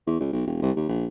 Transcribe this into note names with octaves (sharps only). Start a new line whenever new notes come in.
E2
C#2
B1
E1
C2
D#2
A#1